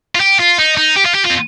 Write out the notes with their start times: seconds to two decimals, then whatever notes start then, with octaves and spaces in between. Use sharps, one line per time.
0.15 F4
0.20 G4
0.39 F4
0.58 D#4
0.77 D#4
0.96 G4
1.05 F4
1.14 G4
1.25 F4
1.30 C4